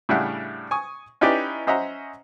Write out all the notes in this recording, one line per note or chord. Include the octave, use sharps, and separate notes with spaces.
A2 C#3 G3 D4 E5 F#5
G#5 C#6 D#6
C#4 D#4 E4 G4 B4 D5
C#4 C5 D#5 E5 F#5 A#5